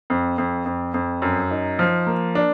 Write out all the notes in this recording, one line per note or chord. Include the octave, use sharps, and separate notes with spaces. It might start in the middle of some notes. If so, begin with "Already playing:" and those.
F2
F2
F2
F2
F#2
D#4
F3
A#3
D4